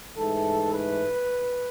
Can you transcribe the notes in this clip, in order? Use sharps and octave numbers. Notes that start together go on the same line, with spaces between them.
G#2 E3 A3 A4
B4